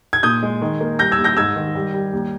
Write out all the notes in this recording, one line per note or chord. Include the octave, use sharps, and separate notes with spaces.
G#6
A#2 D#6 G6
G#3
D#3
A#3
G3 G6 A#6
E6 G#6
D#2
G6 A#6
G#2 E6 G#6
D#3
G3
G3
D#2